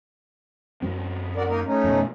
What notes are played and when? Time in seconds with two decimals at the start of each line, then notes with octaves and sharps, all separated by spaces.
0.82 F#2 F#3 C4
1.36 F#4 A#4 D5
1.48 A#3 D#4 A#4
1.66 A3 C#4 D#4
1.84 F2 B2